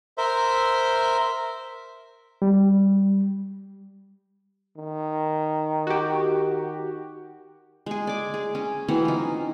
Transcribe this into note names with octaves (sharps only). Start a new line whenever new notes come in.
A#4 C5 E5
G3
D#3
F#4 G4
G#3 G#4
D5 D6
G#4
C#4
E3 F#3 C4 C#4
D#4 F4